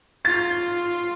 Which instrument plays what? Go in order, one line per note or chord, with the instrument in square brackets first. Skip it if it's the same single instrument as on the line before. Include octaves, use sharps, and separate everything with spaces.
[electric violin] F4 [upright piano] A6